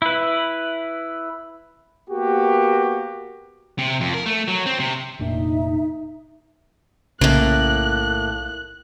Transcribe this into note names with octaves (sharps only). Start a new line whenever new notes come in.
E4 B4
A#3 B3 F#4 G4
C3
F2
A#4
A3
F#3
C4
C3
F1 A#2 D4 D#4 E5
B1 A2 C#3 A#3 F#6